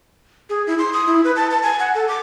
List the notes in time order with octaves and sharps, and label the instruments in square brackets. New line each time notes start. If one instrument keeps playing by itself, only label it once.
[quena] G#4
E4
C6
D#6
E4
B4
A5
A5
G#5
F#5
A4
D6